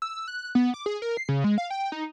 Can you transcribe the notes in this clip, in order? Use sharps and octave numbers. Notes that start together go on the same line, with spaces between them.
E6
F#6
B3
D6
G#4
A#4
C7
C#3
G#3
F5
G5
D#4